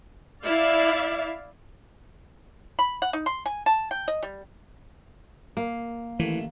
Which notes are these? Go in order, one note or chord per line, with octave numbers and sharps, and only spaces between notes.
E4 D5 E5 F5
B5
F#5
D#4
C6
G#5
A5
G5
D#5
G3
A#3
A1 D#3 E3 A3